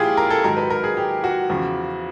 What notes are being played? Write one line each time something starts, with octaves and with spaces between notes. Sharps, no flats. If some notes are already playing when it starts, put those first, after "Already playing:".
Already playing: A#2 F3 E4 F4 G4 G#4
A#4
A4
G#2 D#3 F#3 A#4
B4
A#4
G#4
G4
F#4
E2 C#3 F3